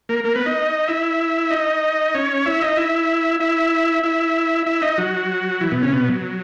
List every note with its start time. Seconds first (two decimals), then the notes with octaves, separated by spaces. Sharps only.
0.09 A#3 A#4
0.24 A#3 A#4
0.35 B3 B4
0.46 D#4 D#5
0.88 E4 E5
1.50 D#4 D#5
2.14 C#4 C#5
2.46 E4 E5
2.61 D#4 D#5
2.77 E4 E5
3.40 E4 E5
4.03 E4 E5
4.66 E4 E5
4.82 D#4 D#5
4.98 F#3 F#4
5.61 E3 E4
5.71 B2 B3
5.82 C#3 C#4
5.92 B2 B3
6.08 F#3